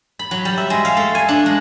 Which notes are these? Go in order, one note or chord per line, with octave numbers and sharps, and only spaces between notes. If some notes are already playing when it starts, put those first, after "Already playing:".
B5
F#3
G3
E5
G#3
F5
A3
G#5
D4
G#3